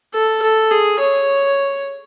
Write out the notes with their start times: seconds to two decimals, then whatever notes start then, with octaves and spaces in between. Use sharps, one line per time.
0.14 A4
0.42 A4
0.71 G#4
1.00 C#5